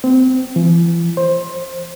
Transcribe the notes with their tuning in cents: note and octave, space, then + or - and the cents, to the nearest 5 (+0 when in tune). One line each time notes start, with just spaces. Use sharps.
C4 -25
E3 +45
C5 +20